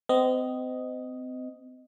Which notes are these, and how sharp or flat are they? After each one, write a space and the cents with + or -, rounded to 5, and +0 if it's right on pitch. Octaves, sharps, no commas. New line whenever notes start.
C4 -35 D#5 +0